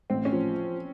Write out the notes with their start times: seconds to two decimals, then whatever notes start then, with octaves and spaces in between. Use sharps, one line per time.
0.10 A1 C4
0.25 C#4
0.32 F3